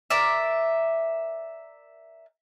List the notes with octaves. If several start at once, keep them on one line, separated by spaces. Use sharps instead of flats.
A#4 D5 E5